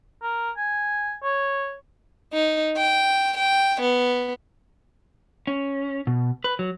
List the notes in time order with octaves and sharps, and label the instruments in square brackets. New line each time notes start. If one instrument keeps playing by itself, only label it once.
[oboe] A#4
G#5
C#5
[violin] D#4
G5
G5
B3
[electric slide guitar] C#4
B2
B4
F#3